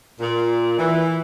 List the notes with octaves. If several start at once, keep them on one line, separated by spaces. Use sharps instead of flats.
A#2
E3